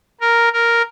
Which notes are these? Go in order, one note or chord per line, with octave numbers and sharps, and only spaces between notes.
A#4
A#4